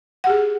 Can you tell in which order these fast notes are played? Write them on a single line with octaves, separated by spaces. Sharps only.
F#5 G4 G#4